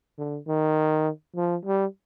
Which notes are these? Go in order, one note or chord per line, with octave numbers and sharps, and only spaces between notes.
D3
D#3
F3
G3